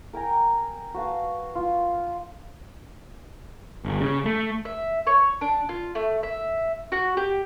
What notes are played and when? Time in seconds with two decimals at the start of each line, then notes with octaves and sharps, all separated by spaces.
0.13 A#4 G5 G#5 A#5
0.94 F#4 B4 F5 A5
1.55 F4
3.85 G1
4.01 C#3
4.25 A3
4.65 E5
5.07 C#5
5.41 D4
5.69 F4
5.95 A3
6.23 E5
6.92 F#4
7.17 G4